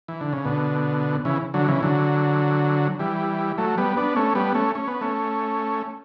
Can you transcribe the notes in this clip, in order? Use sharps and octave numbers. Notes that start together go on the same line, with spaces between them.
E3
D3
C#3
B2 D3
C#3 E3
D3 F#3
C#3 E3
D3 F#3
E3 G3
F#3 A3
G3 B3
B3 D4
A3 C#4
G3 B3
A3 C#4
C#4
B3
A3 C#4